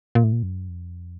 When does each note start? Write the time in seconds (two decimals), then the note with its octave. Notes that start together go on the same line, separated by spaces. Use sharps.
0.15 A#2
0.24 A2
0.32 A#2
0.43 F#2
0.69 F2